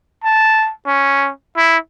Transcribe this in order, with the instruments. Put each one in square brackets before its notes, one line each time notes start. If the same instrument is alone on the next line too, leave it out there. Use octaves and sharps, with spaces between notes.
[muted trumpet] A5
C#4
E4